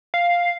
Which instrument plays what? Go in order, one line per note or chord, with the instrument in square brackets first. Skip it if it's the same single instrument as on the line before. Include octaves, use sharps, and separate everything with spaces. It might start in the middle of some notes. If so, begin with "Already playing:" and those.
[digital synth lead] F5